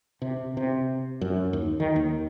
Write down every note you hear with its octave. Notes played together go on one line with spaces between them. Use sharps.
C3
C3
F#2
D#2
D#3
D#2